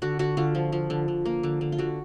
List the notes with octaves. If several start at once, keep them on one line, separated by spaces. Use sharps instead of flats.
D3 F#4
D3 F#4
D3 F4
F3
F3
D3
D3
A#3
D3
D3
F4
D3 F#4